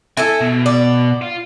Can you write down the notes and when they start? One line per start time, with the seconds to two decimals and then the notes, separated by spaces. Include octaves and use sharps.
0.17 E4 A4 E5 G#5
0.41 B2
0.66 D5
1.22 F4